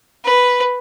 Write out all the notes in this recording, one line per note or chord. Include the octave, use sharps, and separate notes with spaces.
B4